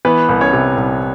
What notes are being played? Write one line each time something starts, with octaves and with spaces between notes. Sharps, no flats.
E3 B3 B4
C2
C#4 C#5
C3
C2